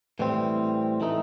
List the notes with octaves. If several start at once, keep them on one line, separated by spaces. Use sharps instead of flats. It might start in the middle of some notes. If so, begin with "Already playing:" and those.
A2 E3 G3 C4
E3 A3 D#4